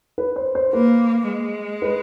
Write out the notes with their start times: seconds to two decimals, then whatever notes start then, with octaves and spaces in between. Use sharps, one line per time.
0.18 B4
0.36 C5
0.55 C5
0.73 A#3 B4
1.27 G#3
1.82 B4